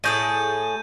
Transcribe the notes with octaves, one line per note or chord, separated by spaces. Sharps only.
A2 G#4 A4 G6 D#7